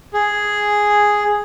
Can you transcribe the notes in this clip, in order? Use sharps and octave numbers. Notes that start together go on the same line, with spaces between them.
G#4